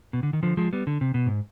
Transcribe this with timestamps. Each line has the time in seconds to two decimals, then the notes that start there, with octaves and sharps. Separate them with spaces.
0.13 B2
0.23 D3
0.33 D#3
0.43 D3 F3
0.57 F3 G#3
0.73 G3 B3
0.87 D3
1.01 C3
1.14 B2
1.26 G#2